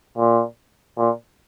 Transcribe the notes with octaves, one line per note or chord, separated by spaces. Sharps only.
A#2
A#2